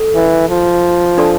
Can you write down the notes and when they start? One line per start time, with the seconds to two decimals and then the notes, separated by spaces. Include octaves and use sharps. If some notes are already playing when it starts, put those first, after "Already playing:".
Already playing: A4
0.15 E3
0.50 F3
1.18 D4 A4 D5 A5 C6